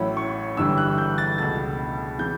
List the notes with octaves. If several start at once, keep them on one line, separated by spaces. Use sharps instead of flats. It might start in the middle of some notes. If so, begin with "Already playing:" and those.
Already playing: A1 A2 F#3 C#4 E4 B5
C#6
G1 G2 E3 G3 E6
F#6
G6
A6
C#2 B2 A3 A6
C#3 E3 G6